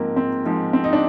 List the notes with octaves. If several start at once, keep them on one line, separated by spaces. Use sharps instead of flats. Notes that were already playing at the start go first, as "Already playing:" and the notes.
Already playing: G#2 F3 G#3 A#3 C4
C4
G#2 F3 G#3
C4
D#4
D4